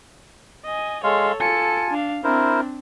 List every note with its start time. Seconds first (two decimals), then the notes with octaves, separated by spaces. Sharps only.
0.65 D#5 G#5
1.04 G#3 A4 C#5 F5 C6
1.40 F4 A4 G#5 A5 C#7
1.90 D4 F5
2.24 C4 D4 E4 A#4 C5